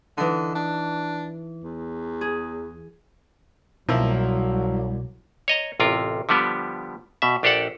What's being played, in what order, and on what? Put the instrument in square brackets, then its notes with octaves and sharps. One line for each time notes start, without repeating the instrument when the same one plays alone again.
[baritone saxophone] D3 [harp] E3 D#4
[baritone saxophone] D4
E2
[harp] G#4
[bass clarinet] C2 [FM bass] B2 [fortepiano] F3 A#3 E4 [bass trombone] F#3
[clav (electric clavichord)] C#5 D#5 A#5
A1 C3 F4 A#4
D3 F3 G3 B3 G4
B2 E5
A#1 D4 G4 A4 D5 F#5